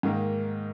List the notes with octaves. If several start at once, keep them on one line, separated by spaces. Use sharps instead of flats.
G#2 D#3 A#3